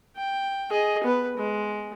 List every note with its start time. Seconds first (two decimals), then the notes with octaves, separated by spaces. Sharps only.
0.16 G5
0.70 G#4 D#5
1.04 B3 B4
1.37 G#3